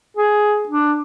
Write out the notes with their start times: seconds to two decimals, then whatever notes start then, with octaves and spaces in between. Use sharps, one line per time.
0.17 G#4
0.68 D4